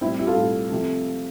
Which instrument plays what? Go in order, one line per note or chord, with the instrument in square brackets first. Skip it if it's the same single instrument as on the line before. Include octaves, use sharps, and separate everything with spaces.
[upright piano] A2 G3 C4 E4
E4 G4
F4 A4
A2 G3
C3 F3 A3